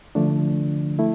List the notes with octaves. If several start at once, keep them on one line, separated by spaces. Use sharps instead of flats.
D3 F3 A3 D4
A3 E4